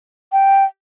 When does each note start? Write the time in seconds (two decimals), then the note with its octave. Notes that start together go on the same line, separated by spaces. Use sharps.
0.32 G5